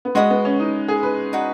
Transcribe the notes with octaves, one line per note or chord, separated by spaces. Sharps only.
B3
G#3 F#4 D#5 B5 D#6
B3
C#4
D#4
G#4
B4
D#4 F#4 B4